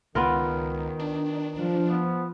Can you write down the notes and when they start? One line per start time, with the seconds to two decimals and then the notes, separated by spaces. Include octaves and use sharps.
0.15 C#2 D#3 B3 F4 A#4
0.99 D4
1.58 F3
1.88 B3